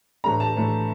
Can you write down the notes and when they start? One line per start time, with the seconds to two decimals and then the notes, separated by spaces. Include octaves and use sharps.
0.24 A2 E3 A3 D4 A#5
0.40 A5
0.55 A2 E3 A3 D4